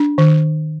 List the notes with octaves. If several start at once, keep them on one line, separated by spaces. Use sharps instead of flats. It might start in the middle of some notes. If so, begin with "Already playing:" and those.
Already playing: D4
D#3